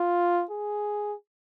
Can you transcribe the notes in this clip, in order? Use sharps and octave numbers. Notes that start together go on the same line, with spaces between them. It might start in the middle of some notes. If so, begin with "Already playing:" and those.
Already playing: F4
G#4